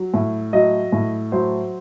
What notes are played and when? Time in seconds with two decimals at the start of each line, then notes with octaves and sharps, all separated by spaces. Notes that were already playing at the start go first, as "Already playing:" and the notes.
Already playing: F#3
0.14 A2
0.53 F#3 D#5
0.92 A2
1.32 F#3 C5